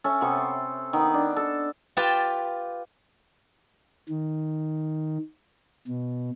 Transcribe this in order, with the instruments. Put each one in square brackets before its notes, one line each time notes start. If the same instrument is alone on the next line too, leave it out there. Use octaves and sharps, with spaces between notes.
[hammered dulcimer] C#4 A4 E5
C3 B3 A4 C#6
C5
D#3 B3 D#4
D4
A4
[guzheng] F4 G4 B4 G5 A5
[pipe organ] D#3
B2